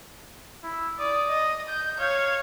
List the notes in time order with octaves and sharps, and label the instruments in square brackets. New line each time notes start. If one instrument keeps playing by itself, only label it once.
[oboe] E4
[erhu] D5 [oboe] D#6
[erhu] D#5
G6
[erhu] C#5 [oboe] F5